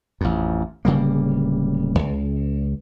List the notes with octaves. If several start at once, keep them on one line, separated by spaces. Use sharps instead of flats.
A1 F2
D1 C#3 G3 A#3
C#2